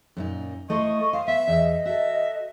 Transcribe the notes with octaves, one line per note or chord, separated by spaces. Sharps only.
F#2 A#2 D#4
A3 E4 C5 D#5 C#6
C5 F5
B3 E5
E2 D#5
F#4 A4 E5